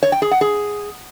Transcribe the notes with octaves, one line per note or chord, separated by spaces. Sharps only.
C#5
G5
G#4
F#5
G#4